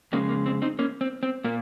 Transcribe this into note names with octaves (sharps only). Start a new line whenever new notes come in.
F2 C#3 G#3 A#3 C#4
A#3
C4
C4 D#4
A#3 C#4
C4
C4
A#2 A#3